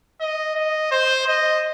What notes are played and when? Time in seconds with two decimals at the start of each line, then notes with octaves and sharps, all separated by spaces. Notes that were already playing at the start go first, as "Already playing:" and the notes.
0.21 D#5
0.55 D#5
0.91 C5
1.27 D#5